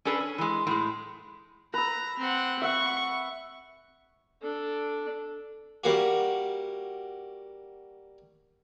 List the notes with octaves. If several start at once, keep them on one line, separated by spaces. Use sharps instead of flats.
C#4 D4 G#4 A4 B4
C#4
E3 G#3
A2 G#3
B4 A#5 E6
C4 F#5
E5 F#5 C#6
D4 A4
G3 A#3 F#4